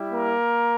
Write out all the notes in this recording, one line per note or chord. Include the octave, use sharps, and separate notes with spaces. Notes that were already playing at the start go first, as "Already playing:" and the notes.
Already playing: G3 E4 G4
A#3 A#4